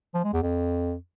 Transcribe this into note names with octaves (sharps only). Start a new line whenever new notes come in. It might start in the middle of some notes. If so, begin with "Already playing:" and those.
F3
G#3
E2
F2